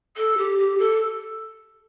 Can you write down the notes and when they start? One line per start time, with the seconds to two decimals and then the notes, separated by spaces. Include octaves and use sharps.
0.17 A4
0.37 G4
0.58 G4
0.78 A4